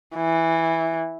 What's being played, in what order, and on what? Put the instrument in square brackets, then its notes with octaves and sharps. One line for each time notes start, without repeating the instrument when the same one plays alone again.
[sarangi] E3